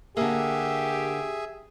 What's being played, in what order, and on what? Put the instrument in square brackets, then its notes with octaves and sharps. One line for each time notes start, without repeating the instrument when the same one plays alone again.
[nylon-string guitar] D3 A#3 [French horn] G4 [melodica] G#4 E5